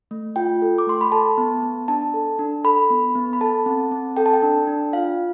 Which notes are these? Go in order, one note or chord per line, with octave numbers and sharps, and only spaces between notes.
A3
F4 G5
A4
D6
A3 C6
B5
A4 A5
B3
B3
D4 A5
A4
D4
A4 B5
B3
B3
B5
A4 A5
C4
C4
A4 G5
A5
G5
D4
D4
F4 F5